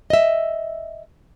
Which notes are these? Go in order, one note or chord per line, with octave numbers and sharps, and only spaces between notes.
D#5 E5